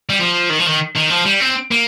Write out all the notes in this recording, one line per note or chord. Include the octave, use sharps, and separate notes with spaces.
G3
F3
D#3
F3
D#3
D#3
F3
G3
C4
A#3